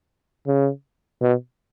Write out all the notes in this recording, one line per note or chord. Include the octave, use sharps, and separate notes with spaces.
C#3
B2